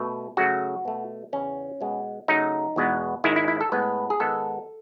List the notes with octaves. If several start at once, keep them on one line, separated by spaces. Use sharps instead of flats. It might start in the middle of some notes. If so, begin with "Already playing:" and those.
Already playing: B2 A3
C#3 F#3 A3 F#4
B2 A3
E2 C#3 E3 C#4
B2 G#3 B3
C#3 F#3 A3 D#4
E2 B2 G#3 B3
G#2 D#3 G#3 E4
E4
E4
A4
A2 G#3 B3 B4
G#4
G#2 D#3 G#3 B3 A4